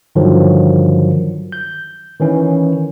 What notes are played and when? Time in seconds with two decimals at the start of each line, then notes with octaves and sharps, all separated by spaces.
0.15 G2 D3 D#3 F3 F#3
1.52 G6
2.20 D#3 E3 C#4